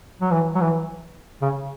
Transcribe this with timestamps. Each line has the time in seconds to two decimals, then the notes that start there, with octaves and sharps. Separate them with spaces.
0.21 F#3
0.31 E3
0.55 F#3
0.61 E3
1.42 C#3